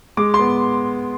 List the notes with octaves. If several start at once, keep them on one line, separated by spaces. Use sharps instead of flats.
G#3 D6
C6
B3